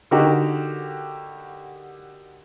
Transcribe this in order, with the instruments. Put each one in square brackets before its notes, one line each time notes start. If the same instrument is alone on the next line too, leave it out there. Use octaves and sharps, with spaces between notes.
[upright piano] D3 D#4 F#4 G4 A#4